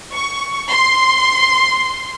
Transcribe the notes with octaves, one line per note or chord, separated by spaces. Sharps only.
C#6
C6